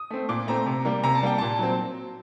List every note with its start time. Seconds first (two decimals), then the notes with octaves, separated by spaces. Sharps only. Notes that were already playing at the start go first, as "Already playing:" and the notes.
Already playing: D#6
0.10 A3 C4
0.29 A#2 D6
0.47 A3 C4 A#5
0.66 C3
0.85 G3 A#3
1.04 C3 A#5
1.15 A5
1.23 G3 A#3 G5
1.38 A#2 A5
1.59 F#3 C4